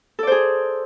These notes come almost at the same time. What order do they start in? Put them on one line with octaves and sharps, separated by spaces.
A4 D5 C5 G#4